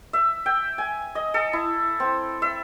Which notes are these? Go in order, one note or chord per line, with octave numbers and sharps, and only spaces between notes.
E5
G5
G#5
D#5
A4
E4
C4
E5